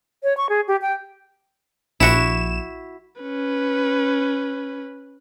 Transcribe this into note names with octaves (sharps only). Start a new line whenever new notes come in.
C#5
C#6
G#4
G4
G5
A#1 E4 F#4 E7
C#4 B4